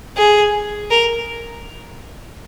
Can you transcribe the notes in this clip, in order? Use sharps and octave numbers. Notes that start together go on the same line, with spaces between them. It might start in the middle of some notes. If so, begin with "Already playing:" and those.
G#4
A#4